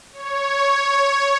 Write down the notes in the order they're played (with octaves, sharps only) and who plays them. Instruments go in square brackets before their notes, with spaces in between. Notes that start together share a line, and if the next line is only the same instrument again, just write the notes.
[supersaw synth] C#5